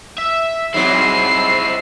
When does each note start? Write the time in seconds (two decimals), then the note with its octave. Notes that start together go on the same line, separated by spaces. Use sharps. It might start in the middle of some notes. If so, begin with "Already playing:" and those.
0.18 E5
0.74 G#2 F#3 C4 E4 C7